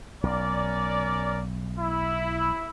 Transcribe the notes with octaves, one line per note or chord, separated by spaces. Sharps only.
B1 C#4 A#4 D5
E4